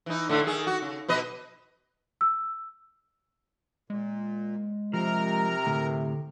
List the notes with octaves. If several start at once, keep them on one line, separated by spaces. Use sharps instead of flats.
E3 D#4
A2 D3 A3
D#3 G#4
F#4
C#3
B2 B4 D#5
E6
A#2 G#3
C3 F3 A#4 A#5 F6
A2 D3